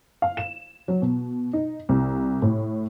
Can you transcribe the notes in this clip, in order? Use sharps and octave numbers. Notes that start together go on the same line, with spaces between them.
F5
E7
F#3
B2
D#4
C2
A2